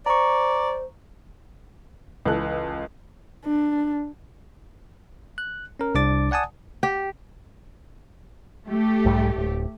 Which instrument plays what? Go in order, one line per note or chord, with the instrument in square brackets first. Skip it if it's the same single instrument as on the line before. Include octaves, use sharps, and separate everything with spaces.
[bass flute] C5 [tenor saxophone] D5 [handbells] A#5 C#6
[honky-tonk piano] C#2 E3 A4 F#6
[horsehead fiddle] D4
[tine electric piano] F#6
C#4 A#4
C2 D4 D6 A6
D5 F#5 G#5 A5 D#6
[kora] G4
[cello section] A3 G4
[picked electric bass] B1 G#2 G3
D1